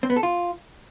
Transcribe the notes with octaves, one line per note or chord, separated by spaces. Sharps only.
C4
B3
A4
F4